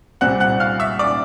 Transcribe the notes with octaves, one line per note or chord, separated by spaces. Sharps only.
C2 A#2 G3 C4 F#5 F#6
F#5 F#6
F5 F6
E5 E6
D5 D6